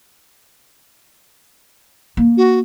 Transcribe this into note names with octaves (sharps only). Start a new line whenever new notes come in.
A#3
F#4